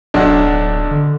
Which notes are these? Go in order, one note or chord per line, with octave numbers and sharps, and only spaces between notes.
D1 B1 D4 F#4
D3